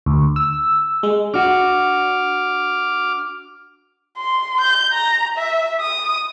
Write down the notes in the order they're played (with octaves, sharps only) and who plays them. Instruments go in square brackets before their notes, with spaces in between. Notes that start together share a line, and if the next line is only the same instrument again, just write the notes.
[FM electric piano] D2
E6
G#3
[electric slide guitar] D4 F#4 [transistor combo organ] D6 F6
[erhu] C6
G6
A#5
E5
D#6